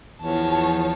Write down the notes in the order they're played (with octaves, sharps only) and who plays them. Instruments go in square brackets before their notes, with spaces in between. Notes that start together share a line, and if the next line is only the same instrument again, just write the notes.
[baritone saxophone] E2 [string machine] F3 [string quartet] C#5 A5